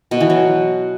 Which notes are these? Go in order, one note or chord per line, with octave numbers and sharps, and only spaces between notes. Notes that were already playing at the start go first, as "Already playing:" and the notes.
B2
E3
F#3